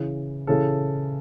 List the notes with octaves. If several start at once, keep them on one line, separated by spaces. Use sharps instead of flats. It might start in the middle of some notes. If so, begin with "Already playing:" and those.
Already playing: C#3 E3
C#3 E3 A4